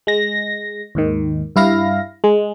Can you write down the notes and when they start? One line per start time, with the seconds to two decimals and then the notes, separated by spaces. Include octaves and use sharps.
0.07 G#3 A#6
0.95 D#2 G#2 D#3
1.56 G2 E4 F5 A#6
2.24 G#3